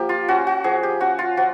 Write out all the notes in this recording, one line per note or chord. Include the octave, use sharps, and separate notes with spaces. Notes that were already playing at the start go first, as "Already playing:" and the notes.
Already playing: F3 A#3 G4
F4
C#4 F#4
F#4
F3 G#4
G4
C#4 F#4
F4
F3 F#4